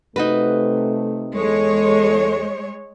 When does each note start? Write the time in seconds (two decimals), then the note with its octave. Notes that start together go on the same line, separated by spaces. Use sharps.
0.16 C3 A3 D#4 F#4 B4
1.36 E2 G#3 A4 C#5